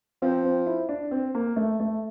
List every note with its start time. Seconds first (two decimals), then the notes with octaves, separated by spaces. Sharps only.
0.22 F3 C4
0.44 C4
0.66 E4
0.89 D4
1.11 C4
1.35 A#3
1.56 A3
1.80 A3